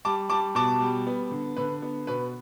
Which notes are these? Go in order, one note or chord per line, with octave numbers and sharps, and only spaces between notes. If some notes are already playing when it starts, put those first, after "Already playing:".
G3 A5 D6
G3 A5 D6
B2 A5 D6
G3
B3
D3
D3 B4
B3
B2 B4